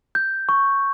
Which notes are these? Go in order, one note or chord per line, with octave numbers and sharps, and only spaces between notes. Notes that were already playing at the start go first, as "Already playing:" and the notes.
G6
C#6